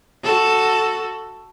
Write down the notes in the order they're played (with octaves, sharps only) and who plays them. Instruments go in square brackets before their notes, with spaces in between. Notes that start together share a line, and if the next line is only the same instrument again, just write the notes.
[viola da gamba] F#4 A4